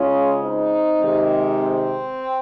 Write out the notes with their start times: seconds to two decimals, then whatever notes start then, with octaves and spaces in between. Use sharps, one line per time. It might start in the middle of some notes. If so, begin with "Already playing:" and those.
Already playing: C#3 G#3 C#4 F4
0.41 C4 D#4
1.01 C3 D#3 G#3
1.60 C4